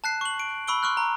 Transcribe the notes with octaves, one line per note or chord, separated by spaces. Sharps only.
A5 F#6 C7
C#6 F#7
D7
B5 C#6 E6 D7 G7
C6 C#6 F6 F#6
A#5